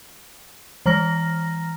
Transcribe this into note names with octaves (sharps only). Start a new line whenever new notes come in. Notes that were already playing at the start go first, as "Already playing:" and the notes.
E3 A#5 F6 A#6